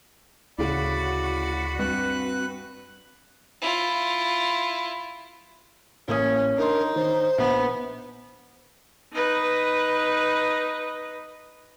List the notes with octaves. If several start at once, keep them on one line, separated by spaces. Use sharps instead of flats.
D2 A2 C#3 F#4 D5 B5
G2 C4 B4 F#6
E4 F4
A1 A#3 C#4 D#6
D4 D#4 A#4 C6
D#3 C5
A#1 B3
D#4 B4